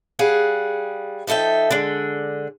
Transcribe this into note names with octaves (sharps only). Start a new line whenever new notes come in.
G3 G#4 F5 F#5
F3 D#4 A4 E5 G5
D3 G#3 D4